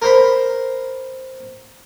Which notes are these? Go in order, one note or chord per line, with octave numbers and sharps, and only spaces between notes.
A#4 C5 B5